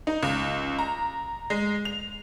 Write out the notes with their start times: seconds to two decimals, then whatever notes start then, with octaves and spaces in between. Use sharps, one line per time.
0.07 D#4
0.23 C#2
0.79 A#5
1.50 G#3
1.85 F7